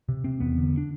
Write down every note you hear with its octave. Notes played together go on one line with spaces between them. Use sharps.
C3
C3 C4
E2 B3
D3
D4